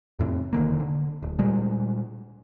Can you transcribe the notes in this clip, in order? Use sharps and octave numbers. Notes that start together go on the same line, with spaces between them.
F2 A2 C3
E1 D3 D#3 A#3
D3
D1
A#2 G3 G#3